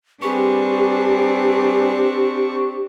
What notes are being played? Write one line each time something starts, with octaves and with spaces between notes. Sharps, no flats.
G3 C4 D4 G4 G#4 B4 C#6